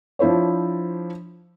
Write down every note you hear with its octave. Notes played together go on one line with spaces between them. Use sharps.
F3 D4 E4 C5 C#5